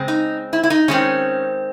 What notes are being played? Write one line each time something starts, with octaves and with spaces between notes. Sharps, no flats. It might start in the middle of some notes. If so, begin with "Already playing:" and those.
Already playing: C#3 G#3 C4
D#4
E4
E4
D#4
D#3 G#3 C4 C#4